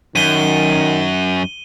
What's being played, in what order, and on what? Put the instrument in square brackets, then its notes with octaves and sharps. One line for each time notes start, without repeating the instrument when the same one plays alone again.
[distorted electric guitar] F#2 [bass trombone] D#3 [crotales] D#7 G7